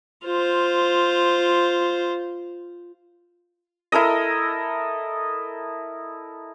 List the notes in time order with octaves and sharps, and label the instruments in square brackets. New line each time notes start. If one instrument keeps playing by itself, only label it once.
[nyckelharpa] F4 C5
[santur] E4 A4 A#4 D#5